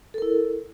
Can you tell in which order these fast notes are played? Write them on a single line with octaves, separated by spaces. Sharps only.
A4 A#4 E4